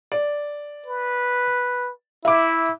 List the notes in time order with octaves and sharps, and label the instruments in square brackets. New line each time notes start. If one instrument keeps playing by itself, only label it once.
[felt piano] D5
[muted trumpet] B4
[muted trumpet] E4 [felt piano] E5 D6